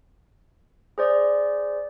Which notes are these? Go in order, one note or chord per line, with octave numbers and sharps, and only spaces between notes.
G#4 C5 D5